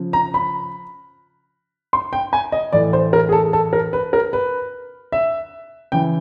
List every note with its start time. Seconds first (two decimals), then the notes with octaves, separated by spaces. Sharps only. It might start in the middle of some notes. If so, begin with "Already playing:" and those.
Already playing: C#3 F3
0.13 A#5
0.34 B5
1.93 C6
2.13 G5
2.33 G#5
2.52 D#5
2.73 A2 E3 D5
2.93 C5
3.13 A#4
3.29 G#4
3.32 A4
3.53 A4
3.73 A#4
3.93 B4
4.13 A#4
4.33 B4
5.12 E5
5.92 C#3 E3 G5